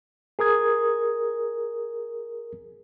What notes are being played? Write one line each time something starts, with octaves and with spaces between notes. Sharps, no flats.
G#4 A#4 D#6 G#6